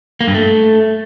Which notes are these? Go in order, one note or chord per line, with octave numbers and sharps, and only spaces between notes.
A#3
G2
A3